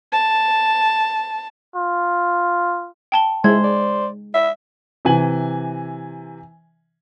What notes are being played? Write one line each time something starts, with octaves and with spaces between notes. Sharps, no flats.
A5
F4
G5 A5 G7
G#3 E4 C5 G#6
D5
E4 E5
C3 E3 G#5 F#7